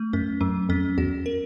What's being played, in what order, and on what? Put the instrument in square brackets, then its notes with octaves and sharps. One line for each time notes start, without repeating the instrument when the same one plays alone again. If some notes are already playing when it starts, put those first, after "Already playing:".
Already playing: [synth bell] A3
[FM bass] F#2 [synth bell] C#4
[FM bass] F#2 [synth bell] F#3
[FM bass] F2 [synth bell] C#4
[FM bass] E2 [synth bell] F#4
[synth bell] A#4